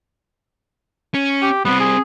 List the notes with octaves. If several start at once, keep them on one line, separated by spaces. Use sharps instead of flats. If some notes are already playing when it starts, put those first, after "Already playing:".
C#4
G4
G3 B3 C4
G#4